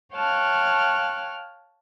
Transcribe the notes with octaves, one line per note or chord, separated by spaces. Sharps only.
C#5 F5 G5 A5 F6 F#6